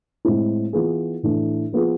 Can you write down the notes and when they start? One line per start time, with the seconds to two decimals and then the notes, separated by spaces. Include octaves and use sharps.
0.25 A2 G#3 C4 E4
0.73 E3 B3 F4 G#4
1.23 A2 E3 A3 D4
1.72 F3 B3 F4 G#4